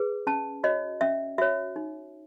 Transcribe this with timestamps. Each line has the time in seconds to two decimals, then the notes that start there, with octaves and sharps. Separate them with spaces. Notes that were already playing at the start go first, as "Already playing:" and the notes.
Already playing: G#4 B4
0.27 C#4 A5
0.64 F#4 C#5 D#5
1.01 C#4 E5
1.38 F#4 C#5 E5
1.76 D#4